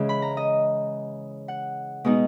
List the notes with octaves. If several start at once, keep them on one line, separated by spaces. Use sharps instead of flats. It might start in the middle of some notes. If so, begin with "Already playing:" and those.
Already playing: C#3 E3 G#3
B5
A#5
D#5
F#5
B2 G#3 B3 D#4